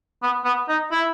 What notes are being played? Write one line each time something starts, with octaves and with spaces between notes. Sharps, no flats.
B3
B3
D#4
E4